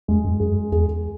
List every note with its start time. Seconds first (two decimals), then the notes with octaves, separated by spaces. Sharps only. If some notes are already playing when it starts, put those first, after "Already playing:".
0.08 E2 G#3
0.24 F#2
0.40 F#2 G#4
0.72 E2 G#4